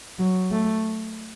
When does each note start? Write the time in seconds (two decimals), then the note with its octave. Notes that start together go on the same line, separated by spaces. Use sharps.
0.19 F#3
0.51 A3